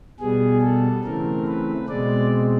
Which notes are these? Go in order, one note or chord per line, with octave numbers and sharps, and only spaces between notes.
B2 G3 B3 G#4
A4
C#3 E3 A3 C4 A#4
B4
B2 G#3 C4 D5